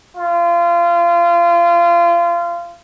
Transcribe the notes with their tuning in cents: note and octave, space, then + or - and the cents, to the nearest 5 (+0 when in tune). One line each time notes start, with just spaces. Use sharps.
F4 -25